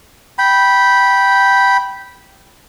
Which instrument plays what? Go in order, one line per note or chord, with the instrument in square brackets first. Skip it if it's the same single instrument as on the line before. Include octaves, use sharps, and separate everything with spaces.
[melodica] G5 B5